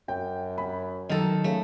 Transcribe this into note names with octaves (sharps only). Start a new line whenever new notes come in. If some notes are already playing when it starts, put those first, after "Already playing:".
F#2 G5
B5
D#3 F#3 A4 D#5
C#3 A3